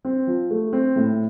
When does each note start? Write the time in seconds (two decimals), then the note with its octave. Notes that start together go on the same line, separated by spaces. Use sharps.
0.05 C4
0.27 F3
0.50 A3
0.73 C4
0.96 A2